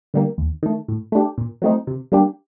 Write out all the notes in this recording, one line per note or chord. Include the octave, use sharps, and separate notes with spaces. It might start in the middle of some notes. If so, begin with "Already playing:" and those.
D3 G3 A#3
D#2
D#3 A3
A2
A3 D4 G4
A#2
F#3 A3 C4 D#4
C3
G3 A#3 D4 G4